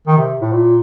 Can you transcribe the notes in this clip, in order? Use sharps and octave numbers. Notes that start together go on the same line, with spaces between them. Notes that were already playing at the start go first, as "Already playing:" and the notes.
D#3
C3
A2
A#2